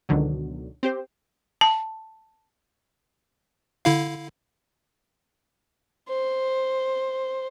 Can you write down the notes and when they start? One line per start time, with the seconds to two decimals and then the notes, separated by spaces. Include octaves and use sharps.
0.09 C#2 B2 D3 D#3 F#3
0.83 C4 G4 C5
1.61 A5
3.85 D3 E4 F5
6.08 C5